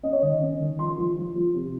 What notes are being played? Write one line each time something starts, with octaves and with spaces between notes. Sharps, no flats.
C#4 D#5
C#5
D#3 D#5
C#4
D#3
F3 C6
F3
F3
F3
C3